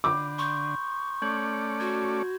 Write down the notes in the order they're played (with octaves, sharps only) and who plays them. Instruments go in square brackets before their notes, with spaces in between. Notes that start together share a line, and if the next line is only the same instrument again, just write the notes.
[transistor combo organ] D3 [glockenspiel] B5 G6 [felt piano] D6
[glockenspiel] C6 G6 [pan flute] C#6
[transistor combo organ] A3 C#4 D5 [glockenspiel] G6 G#6 F#7
[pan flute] F#4 [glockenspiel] G#6